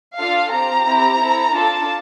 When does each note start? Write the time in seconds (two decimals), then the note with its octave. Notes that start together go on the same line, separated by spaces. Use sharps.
0.17 D4 F4 A4 F5
0.52 C4 G4 A#5
0.87 C4 E4 G4
1.21 C4 E4 A4
1.54 D4 F4 A4 A5